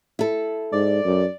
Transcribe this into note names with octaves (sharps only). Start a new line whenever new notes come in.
E4 A4
G#2 D5
F#2